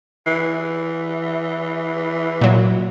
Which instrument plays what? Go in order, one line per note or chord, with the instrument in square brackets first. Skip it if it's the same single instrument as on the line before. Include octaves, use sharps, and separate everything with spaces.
[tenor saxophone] E3
[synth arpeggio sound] A#2 F#3